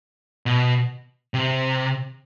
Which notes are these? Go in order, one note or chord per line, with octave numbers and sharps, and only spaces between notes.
B2
C3